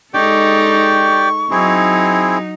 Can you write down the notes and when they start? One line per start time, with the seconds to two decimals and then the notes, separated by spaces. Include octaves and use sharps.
0.14 G#3 D#4 G4 A4 D5 G5 C#6
1.51 F#3 C4 D#4 E4 G#4